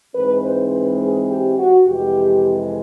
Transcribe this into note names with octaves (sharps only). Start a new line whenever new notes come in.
G#2 E3 G#3 C4 B4
C5
B4
G#4
G4
F#4
F2 C3 E3 G#3 G4